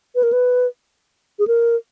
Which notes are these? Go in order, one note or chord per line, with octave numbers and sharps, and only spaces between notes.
B4
A#4
B4
G#4
A#4